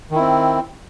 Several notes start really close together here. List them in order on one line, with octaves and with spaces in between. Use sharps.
D#3 E4 C4